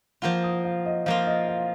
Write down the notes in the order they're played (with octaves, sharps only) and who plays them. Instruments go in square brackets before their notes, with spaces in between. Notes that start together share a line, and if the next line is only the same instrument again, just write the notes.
[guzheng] F3 A#3 F4 [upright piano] F#5
[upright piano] D#6
F5
D#5
[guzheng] F3 A#3 F4 [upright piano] F5
[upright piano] D#5
F5